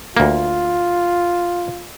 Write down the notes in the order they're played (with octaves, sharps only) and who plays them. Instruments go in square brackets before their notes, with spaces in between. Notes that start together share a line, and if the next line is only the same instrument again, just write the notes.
[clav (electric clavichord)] D2 A#3 [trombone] F4